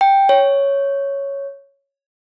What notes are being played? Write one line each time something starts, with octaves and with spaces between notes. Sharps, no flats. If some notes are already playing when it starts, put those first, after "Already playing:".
G5
C#5